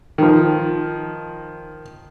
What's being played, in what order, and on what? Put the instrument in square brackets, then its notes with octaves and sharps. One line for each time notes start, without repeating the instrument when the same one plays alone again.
[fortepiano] D#3 F3